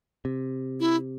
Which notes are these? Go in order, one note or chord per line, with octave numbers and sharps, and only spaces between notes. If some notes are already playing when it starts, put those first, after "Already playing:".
C3
E4